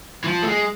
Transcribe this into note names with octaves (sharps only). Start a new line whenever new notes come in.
E3
F3
A3
G#3